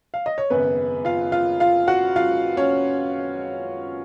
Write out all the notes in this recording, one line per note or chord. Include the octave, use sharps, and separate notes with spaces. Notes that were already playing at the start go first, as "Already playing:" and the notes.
F5
D#5
C#5
G#1 F#2 C#3 B3 B4
F4 F5
F4 F5
F4 F5
F#4 F#5
F4 F5
C#4 C#5